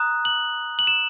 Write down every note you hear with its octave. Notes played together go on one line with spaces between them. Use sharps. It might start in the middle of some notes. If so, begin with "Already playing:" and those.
Already playing: A#5 D#6 F#6
F#7
F#7
E7